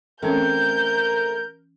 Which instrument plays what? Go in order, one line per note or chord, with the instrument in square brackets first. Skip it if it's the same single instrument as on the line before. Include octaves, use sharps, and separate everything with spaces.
[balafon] E3 C#4 C#5 [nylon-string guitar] A3 C4 [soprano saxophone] A#4 [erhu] G6